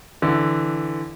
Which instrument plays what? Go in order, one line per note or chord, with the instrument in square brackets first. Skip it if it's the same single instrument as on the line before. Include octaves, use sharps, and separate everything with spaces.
[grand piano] D3 E3